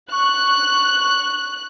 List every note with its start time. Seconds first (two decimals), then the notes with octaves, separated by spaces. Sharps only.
0.12 C#6 F#6